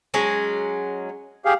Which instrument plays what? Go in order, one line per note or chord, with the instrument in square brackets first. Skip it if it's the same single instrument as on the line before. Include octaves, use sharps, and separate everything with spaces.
[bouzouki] F#3 G#3 C#4
[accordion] G4 G#4 F5